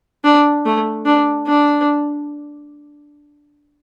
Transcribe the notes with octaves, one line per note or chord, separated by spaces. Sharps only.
D4
A3
D4
D4